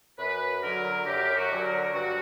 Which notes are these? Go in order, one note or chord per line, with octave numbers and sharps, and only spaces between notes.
F#2 B4
D3 F#3 A#4
F#2 G4
F#4
D3 F#3
A#4
G2 F#4